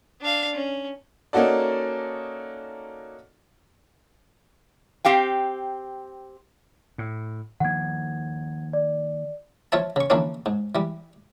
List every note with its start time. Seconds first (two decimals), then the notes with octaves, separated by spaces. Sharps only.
0.21 D4 F5
0.54 C#4
1.33 A#3 C#4 D#4 F#4 A4 D5
5.05 C4 G4 F5 G5
6.98 A2
7.60 D#3 F3 A#3 F#5 G#6
8.73 D5
9.72 F3 F4 C#5 E5 A5
9.96 C#3 C#6
10.10 D3 E3 F3 A#3 C4 C#4
10.46 G#2
10.75 E3 G3